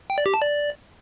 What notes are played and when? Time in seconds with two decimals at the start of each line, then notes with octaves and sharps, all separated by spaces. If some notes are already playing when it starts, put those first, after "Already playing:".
0.10 G5
0.18 D5
0.26 G4
0.34 A5
0.42 D5